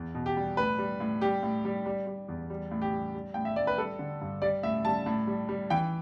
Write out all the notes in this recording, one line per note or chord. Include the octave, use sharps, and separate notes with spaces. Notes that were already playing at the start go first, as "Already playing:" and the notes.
Already playing: E2
B2
G4
G3
A2 B4
G3
A2
G3 G4
A2
G3
G3
G3
E2
G3
A2
G4
G3
G3
A2 G5
E5
A2 D5
B4
G3 A4
D3
G2
G3 D5
A2 E5
G3 A5
A2
G3
G3
E3 G5